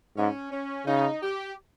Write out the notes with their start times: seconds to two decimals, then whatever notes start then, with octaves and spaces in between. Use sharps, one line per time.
0.17 G#2 C#4
0.51 C#4
0.86 C#3 D#4
1.21 G4